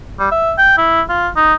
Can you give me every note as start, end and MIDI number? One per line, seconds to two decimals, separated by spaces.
0.19 0.27 55
0.31 0.53 76
0.58 0.77 79
0.78 1.02 64
1.09 1.28 65
1.36 1.54 63